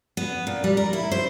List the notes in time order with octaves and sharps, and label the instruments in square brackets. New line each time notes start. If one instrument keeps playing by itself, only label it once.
[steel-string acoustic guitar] B3
A#2
G3
A#4
E4
C5